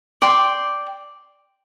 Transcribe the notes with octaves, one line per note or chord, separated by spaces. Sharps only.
D5 G5 C6